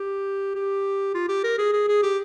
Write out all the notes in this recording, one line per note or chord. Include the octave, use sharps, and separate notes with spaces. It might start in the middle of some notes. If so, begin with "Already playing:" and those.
Already playing: G4
G4
F4
G4
A#4
G#4
G#4
G#4
G4